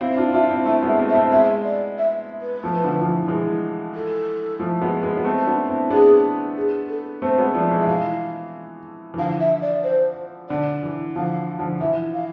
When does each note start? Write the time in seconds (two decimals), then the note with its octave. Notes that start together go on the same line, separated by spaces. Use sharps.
0.01 C4 E4 F5
0.17 D4 F4
0.33 D4 F4 E5
0.50 C4 E4
0.66 A3 C4 E5
0.82 G#3 B3
0.88 E5
0.99 A3 C4
1.09 E5
1.15 A3 C4
1.32 G#3 B3 E5
1.65 D5
1.98 E5
2.41 B4
2.63 F3 A3
2.84 D3 F3
3.01 F3
3.06 E3
3.28 E3 G#3
3.95 A4
4.60 F3 A3
4.81 G#3 B3
5.03 G#3 B3
5.17 B3
5.25 A3 C4
5.47 B3 D4
5.69 C4 E4
5.90 B3 D4 G#4
6.56 G#4
6.89 A4
7.22 A3 C4 C5
7.38 G#3 B3
7.54 F3 A3 D5
7.71 E3 G#3
7.81 E5
7.87 E3 F5
9.14 E3
9.18 D3 F3 F5
9.40 E5
9.62 D5
9.84 C5
10.49 D3 D5
10.83 E3
11.16 D3 F3 F5
11.59 D3 F3
11.81 E3 E5
12.14 F5